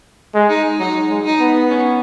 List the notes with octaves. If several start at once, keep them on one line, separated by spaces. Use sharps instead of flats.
G#3
D#4
F#3 D#4
G#3
D#4
B3
C#4